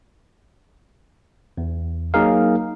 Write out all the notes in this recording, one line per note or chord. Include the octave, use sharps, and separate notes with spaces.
E2
F#3 A#3 D#4 G#4 A#4 F5